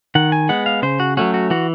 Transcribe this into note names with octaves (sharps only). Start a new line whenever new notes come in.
D#3 F#5
G#5
G#3 B3 F#5
F5
C#3 C5
F#4
F#3 A3 C#4 F#4
F#4
E3 F#4